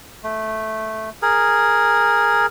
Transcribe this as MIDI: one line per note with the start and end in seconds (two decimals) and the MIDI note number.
0.24 1.10 57
1.22 2.46 68
1.22 2.46 70